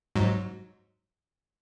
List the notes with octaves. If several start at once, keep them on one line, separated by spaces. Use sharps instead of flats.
G#2 F#3